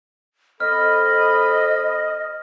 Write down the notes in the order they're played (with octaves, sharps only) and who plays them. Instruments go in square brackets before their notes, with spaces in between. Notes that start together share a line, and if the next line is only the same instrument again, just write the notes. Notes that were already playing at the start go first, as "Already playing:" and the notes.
[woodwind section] C4 A4 B5 [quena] D#5 [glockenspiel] F6